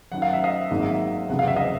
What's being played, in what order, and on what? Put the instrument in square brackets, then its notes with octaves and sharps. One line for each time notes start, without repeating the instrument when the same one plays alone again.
[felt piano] F#2 D#3 F#3 [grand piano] F#5
[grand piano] F5
E5
D#5 F5
[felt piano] G#1 G#2 D#3 F#3 A#3
[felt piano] F1 E2 C#3 F#3 [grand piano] F#5
[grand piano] F5
E5
D#5 F5